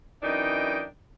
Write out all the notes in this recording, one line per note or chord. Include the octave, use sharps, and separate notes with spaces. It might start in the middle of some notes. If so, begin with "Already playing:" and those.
F#2 E3 D4 D#4 D#5 G5